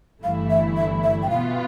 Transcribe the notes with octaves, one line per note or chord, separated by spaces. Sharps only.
G1 G2 E3 A3 E4 F5
E5
E5
E5
G5
B2 B3 F4 F5